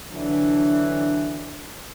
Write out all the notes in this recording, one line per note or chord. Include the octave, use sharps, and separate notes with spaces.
D3 E3 F#3 D4